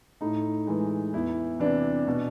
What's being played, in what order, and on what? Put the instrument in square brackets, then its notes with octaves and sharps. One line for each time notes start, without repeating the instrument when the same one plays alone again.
[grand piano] A2 D#4
E3 G#3
E2 E4
C3 E3 D4
B2